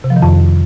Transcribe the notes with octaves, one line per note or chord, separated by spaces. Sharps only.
C3
F3
D#3
F2